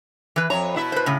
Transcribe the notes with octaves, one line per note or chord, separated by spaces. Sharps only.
E3 B4
F2 F#3 C#5 A#5
B2 E4 E5
B4 C5
A2 C#3